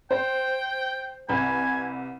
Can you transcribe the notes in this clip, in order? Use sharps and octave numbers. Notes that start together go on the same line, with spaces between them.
C5 G5
C2 B4 G#5 B5